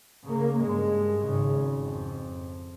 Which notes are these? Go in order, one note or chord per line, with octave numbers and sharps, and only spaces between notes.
C#3 A#3
G2 G#3
G#1 C#3
F2